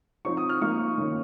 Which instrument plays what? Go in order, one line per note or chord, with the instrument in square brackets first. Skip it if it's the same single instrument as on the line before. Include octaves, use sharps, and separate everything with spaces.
[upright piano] F3 C4 D#4 C#6
D#6
F6
F3 A#3 D#4 C#6
D#3 A#3 C#4